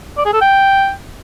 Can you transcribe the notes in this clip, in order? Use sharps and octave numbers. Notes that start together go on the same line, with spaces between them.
D5
G#4
A4
G5